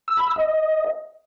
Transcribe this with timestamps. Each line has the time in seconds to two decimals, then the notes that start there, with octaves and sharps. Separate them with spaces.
0.08 E6
0.17 B5
0.27 E6
0.36 D#5